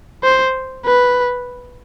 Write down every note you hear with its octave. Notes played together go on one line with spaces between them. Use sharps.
C5
B4